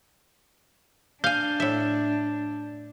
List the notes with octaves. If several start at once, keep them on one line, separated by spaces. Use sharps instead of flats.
D4 F5 G#5 G6
A2 E5